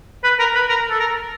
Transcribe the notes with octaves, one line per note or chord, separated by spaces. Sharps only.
B4
A#4
B4
A#4
A4
A#4